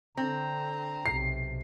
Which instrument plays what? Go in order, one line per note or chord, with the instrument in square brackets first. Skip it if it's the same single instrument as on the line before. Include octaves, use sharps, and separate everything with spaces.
[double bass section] D3 [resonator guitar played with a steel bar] C4 [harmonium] A#5
[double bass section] B1 C3 [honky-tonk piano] C7